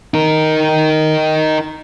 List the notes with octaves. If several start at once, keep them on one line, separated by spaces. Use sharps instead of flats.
D#4 A#4